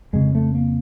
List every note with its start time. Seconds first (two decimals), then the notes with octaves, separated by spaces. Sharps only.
0.13 F2 C#3 G#3
0.35 A3
0.55 A#3